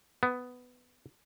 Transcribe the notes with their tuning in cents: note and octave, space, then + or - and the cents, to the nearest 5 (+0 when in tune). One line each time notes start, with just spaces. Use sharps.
B3 +10